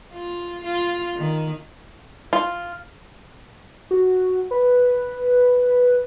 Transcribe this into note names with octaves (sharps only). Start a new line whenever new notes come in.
F4
F4
D#3
F4
F#4
B4